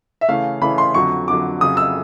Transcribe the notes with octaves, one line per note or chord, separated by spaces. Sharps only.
E5
C#3 E3 A3 C#4 F5
C#3 E3 A3 C#4 B5
C6
F2 D3 F#3 C#6
F2 D3 F#3 D6
F2 C#3 F#3 D#6
E6